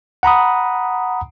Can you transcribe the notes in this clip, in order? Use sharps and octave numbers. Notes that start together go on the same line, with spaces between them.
F#5 A#5 B5 D#6